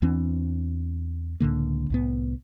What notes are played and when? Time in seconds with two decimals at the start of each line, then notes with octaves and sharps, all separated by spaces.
0.02 E2 E3 C4 D4
1.40 C#2 A2 D3 A#3
1.90 C2 A2 B3